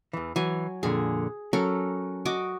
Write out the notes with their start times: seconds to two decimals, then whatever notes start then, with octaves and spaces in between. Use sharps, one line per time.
0.13 E2 E3
0.36 E3 F#3 G#5
0.83 F2 A#2 D3 G#4
1.53 F#3 C#4 A4 A#4
2.25 F#4 D#5 D6